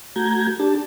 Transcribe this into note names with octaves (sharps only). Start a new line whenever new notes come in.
A3 F#4 A#5 G6 G#6
D4 G4 A5